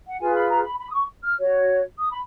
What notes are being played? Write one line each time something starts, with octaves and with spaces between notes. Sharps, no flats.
F#5
F4 G#4 B4 G#5
B5
A#5
B5
B5
D#6
C#6
F6
F#4 C#5
D#6
B5